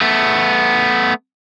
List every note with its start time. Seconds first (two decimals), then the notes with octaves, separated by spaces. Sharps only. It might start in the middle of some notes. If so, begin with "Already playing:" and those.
0.01 A3 B3